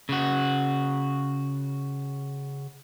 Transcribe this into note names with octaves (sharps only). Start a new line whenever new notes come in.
C#3 F#4